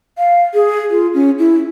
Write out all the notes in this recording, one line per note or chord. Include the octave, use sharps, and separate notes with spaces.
F5
G#4
F4
C#4
E4